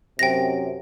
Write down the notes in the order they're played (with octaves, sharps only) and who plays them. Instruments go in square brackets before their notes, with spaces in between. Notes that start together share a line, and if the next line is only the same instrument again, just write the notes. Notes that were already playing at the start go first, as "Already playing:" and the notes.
[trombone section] F#2 C3 [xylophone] G5 A#6